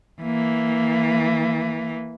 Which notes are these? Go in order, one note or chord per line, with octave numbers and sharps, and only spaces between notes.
E3 A#3